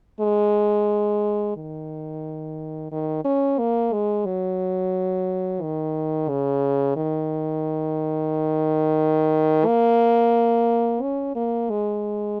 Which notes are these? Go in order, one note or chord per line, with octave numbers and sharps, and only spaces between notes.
G#3
D#3
D#3
C#4
A#3
G#3
F#3
D#3
C#3
D#3
A#3
C#4
A#3
G#3